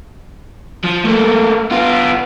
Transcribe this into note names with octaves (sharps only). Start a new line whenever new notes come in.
F3
A3 A#3
B3 F4